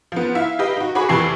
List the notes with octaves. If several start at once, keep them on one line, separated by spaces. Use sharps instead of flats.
F3 B3
E4 F4 E5 F5
G4 B4 D#5 F5
D#4 F#4
F#4 G#4 C#5 G#5 B5 D6
F1 C3 E3 A5 C#6 C7